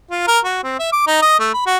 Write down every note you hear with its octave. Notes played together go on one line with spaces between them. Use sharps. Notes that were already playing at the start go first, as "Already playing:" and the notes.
F4
A#4
F#4
C4
E5
D6
D#4
D#5
A3
B5
F#4